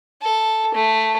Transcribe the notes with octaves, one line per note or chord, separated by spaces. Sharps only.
A4
A3